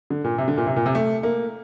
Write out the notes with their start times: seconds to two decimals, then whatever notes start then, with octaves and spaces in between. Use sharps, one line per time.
0.10 D3
0.24 A#2
0.38 C3
0.48 D3
0.57 A#2
0.67 C3
0.76 A#2
0.86 C3
0.95 A3
1.23 A#3